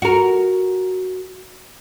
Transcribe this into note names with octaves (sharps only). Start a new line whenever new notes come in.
F#4 A#4